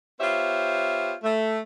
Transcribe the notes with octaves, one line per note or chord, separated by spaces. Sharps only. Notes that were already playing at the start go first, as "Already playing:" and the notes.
B3 F4 G4 C5 C#5 E5
A3